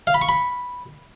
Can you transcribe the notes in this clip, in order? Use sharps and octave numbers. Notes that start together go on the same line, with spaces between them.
F5
B5
C#6
B5